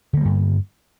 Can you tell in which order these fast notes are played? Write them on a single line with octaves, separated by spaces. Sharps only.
D3 A#3 G3 G2